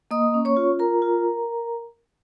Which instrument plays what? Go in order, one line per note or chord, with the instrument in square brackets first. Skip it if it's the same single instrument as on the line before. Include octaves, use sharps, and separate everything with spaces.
[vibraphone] A#3 D#5 D#6
C#4
C#5 C#6
F4
F4 A#4 A#5
F4